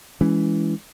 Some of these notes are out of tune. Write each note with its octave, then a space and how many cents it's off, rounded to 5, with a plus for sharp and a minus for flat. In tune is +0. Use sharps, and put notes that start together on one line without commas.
E3 +0 G#3 +0 C#4 +25